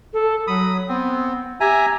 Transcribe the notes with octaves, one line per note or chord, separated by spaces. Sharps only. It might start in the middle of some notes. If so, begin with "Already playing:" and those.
A4
F#3 B5 D#6
B3 C4
G4 E5 G#5 A#5